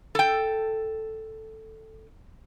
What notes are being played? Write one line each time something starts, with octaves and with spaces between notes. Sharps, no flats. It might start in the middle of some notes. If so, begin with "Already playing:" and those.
A4 G5